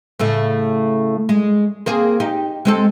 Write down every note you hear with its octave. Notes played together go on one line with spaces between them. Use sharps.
A2 C#3 A3
G#3
A#3 C4 G#4
D#4 G4
G#3 C4 A4